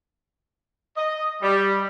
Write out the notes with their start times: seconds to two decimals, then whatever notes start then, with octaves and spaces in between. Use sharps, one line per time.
0.97 D#5
1.42 G3